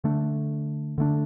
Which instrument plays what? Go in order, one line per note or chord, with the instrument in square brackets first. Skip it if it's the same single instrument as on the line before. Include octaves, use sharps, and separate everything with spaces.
[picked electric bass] D3 A3 D4
D3 A3 D4